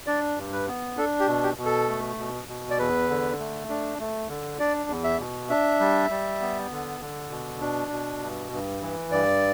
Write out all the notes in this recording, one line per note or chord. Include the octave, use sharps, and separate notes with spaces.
D4 D5
G2
B4
B3
D4 A4
G4
B2
G4
B2
A4
A3
B2
B2
D5
E2 B4
D3
A3
D4
A3
D3
D4 D5
E2
E5
B2
D4 E5
G3
G3
B3
D3
D3
B2
D4
B2
G2
G2
E3
G2 D5